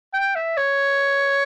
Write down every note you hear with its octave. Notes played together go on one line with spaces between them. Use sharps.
G5
E5
C#5